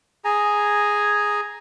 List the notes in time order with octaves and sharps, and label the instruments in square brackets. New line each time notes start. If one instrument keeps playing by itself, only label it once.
[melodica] G#4 G#5 A#5